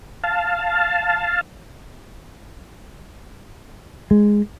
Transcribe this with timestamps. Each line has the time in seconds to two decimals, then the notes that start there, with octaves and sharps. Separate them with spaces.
0.24 F5 A5
4.11 G#3